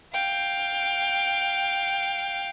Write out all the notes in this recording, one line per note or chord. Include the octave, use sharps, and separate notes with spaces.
F5 G5